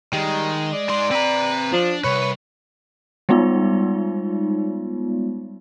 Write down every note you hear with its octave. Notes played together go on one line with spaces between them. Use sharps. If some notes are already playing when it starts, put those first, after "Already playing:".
D#3 G3 G#3
D5
G#2 C6
C4 B4 A#5
F3 D4
C2 B4 C#5
G3 G#3 B3 D#4 F4